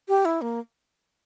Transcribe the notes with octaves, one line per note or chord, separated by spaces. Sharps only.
G4
E4
A#3